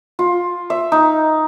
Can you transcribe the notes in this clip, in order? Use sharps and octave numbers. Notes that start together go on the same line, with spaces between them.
F4
E5
D#4